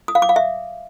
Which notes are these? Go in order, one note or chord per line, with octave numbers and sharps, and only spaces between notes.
D#6
F5
D6
F5
E5